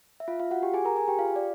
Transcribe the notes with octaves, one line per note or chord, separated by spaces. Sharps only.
E5
F4 F5
F4 F5
F#4 F#5
G4 G5
G#4 G#5
A#4 A#5
G#4 G#5
G4 G5
F4 F5
D5